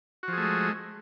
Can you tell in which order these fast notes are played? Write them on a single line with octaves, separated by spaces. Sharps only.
F#4 F3 G#4 A3 G#3